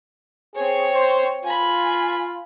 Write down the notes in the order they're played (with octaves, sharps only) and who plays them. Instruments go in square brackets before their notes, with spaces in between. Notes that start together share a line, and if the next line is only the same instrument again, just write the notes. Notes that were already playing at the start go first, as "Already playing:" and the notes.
[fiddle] C4 C#5 [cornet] G#4
[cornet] C5
[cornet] F4 [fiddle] G#5 B5